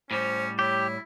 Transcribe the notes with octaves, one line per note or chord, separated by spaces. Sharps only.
A2 G3 C#4 C5
E4 G4 C#5